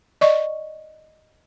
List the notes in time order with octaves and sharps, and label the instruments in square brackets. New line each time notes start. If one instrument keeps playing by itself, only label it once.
[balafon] D5 D#5 C#6